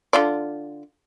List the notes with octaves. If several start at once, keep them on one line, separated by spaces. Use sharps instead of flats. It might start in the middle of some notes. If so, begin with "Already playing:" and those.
D3 F4 D5